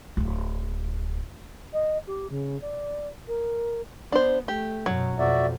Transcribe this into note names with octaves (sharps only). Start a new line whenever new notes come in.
D1 G#1
D#5
G4
C#3
D5
A#4
B3 D4 C5
A3 G4
F#2 B2 F#3
F2 B2 F#4 D5 E5